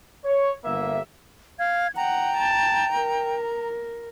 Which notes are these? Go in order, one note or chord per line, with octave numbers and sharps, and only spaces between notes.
C#5
G1 A#3 E5
F5 G#6
F#5 G5 A#5
A5
A#4